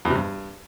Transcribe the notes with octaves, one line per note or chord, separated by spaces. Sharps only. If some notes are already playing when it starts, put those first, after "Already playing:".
E2
C3
G2